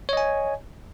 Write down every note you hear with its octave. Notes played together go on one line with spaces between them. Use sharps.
C#5 D#5 G#5